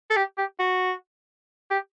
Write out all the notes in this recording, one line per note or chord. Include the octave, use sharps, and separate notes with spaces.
A4
G4
G4
F#4
G4